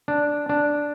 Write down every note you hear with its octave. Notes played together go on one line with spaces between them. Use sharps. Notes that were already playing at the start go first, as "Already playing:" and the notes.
D4
D4